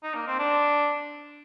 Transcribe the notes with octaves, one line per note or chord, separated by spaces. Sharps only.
D#4
A#3
C4
D4